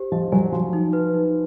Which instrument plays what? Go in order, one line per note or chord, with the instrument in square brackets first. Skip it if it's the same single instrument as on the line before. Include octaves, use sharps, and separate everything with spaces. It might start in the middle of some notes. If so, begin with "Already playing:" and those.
Already playing: [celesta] G4 C5
[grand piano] F3 [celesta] D#5
[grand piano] F#3 [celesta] G#5
[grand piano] F3 [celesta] F#4
[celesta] D#4
B4
D#4